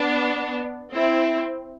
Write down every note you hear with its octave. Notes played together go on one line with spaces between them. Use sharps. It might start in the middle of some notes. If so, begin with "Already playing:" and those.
Already playing: B3 D4
C4 E4